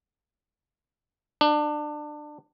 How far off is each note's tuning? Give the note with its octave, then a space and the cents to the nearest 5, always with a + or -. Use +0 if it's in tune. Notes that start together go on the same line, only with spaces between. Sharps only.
D4 +25